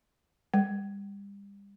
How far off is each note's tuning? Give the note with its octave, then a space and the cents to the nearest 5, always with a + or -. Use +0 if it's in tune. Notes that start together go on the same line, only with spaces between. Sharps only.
G3 +35